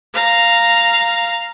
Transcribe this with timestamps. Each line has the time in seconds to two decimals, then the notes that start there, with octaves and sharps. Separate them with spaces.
0.15 F5 A#5